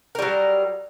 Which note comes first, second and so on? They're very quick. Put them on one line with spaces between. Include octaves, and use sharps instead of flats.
A#4 G3 F#3